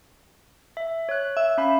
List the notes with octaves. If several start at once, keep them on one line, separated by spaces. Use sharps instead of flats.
E5
C#5 F#6
E5
C#4 F5 B5